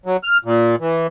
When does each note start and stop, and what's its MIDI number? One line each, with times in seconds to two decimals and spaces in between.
0.06 0.17 54
0.23 0.38 89
0.45 0.76 46
0.80 1.07 52